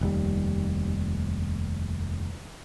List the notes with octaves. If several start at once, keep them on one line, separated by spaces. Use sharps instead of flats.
F1 D#2 G3